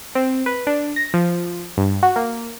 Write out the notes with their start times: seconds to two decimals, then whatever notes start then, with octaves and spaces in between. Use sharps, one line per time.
0.15 C4
0.46 B4
0.67 D4
0.96 A#6
1.14 F3
1.78 G2
2.03 F#4
2.16 A#3